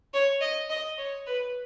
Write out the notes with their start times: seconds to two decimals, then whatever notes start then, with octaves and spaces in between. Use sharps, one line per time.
0.14 C#5
0.41 D#5
0.70 D#5
0.98 C#5
1.27 B4